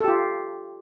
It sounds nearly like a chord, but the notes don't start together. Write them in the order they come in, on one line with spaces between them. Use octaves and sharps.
A4 G4 F4